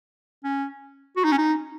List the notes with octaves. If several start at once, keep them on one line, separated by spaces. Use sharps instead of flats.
C#4
F#4
D#4
C#4
D#4